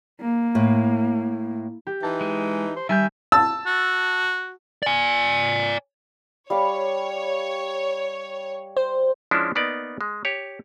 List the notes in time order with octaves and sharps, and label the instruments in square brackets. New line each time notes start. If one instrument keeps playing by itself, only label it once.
[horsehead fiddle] A#3
[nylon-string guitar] A2
[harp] G4
[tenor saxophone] E3 [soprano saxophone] D#4 [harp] A5
[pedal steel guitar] G#3
[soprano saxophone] C5
[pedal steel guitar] D#3 G#5 G6 [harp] G3 F6 [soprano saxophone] E5
[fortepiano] A5 E6
[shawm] F#4
[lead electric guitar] D5 G#5
[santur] G3 F5 D6 [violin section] C#5
[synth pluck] C5
[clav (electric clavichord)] F3 G#3 C#4 D4 E4
A#3 B3 D#4 D5
G#3
G4 C#5